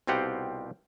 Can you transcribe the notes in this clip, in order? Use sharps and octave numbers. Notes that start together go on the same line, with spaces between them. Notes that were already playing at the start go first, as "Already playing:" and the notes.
C2 B2 C4 F4 G4 F#5